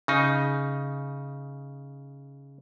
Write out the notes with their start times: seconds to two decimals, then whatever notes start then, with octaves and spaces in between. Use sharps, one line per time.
0.08 C#3 D#4